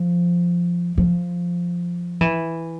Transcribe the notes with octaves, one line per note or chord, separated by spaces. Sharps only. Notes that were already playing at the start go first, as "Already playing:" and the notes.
Already playing: F3
F3
E3